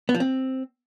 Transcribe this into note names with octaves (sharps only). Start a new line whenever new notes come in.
B3
F3
C4